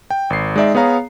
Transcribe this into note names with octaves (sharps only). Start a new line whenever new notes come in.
G5
G#1 C7
G#3 D#4 D5 E5
B3 G#4 C#5 F5 A#5